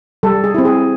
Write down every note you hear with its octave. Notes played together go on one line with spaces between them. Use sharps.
G3 A4
G#4
C4 E4
G#4